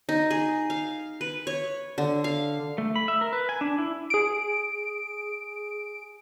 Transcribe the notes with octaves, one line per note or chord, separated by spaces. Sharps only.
D#4
G#4
F5
B4
C#5
D3
F5
A3
B5
E5
A#4
B4
G#5
D4
E4
G#4 D7